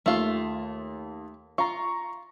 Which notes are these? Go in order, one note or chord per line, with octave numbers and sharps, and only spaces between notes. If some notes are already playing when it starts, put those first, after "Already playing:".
D#2 A3 F4
F4 A#5 C#6